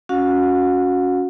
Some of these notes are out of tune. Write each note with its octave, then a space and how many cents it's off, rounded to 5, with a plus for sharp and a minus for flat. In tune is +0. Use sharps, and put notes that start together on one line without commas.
C#4 +5 F#4 -25 F#5 -40